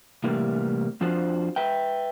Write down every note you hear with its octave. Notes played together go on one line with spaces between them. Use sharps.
A2 C3 E3 G3 A#3
F2 F3 D4 F#4 C5
B4 E5 G5